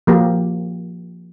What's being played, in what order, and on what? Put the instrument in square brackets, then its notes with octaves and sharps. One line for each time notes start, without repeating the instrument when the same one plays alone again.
[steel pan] F3 A#3 F#4 G4